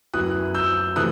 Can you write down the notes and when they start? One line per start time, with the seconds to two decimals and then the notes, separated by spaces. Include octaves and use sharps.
0.14 F#2 F#3 B3 E4 D#6 F#6
0.55 E6 G6
0.96 C3 E3 A3 D#6 F#6